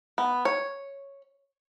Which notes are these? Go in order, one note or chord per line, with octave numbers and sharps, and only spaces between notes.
B3
C#5